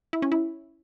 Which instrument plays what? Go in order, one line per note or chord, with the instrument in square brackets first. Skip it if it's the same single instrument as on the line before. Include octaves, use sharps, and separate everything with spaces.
[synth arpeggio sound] E4
C#4
E4